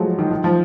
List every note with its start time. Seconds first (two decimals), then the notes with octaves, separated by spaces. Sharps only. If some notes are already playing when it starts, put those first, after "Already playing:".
Already playing: F3 F#3 G#3 A3
0.19 D#3
0.31 D#3
0.44 F3